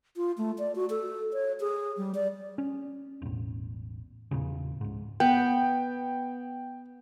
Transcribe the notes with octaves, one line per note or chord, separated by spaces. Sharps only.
F4
A3
D5
F#4
A4
C#5
G#4
G3
D5
C#4
E1 A1
E2 A#2 C#3
C#2 G#2
B3 G5